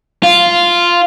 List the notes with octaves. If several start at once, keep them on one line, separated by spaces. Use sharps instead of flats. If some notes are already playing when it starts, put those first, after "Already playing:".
F4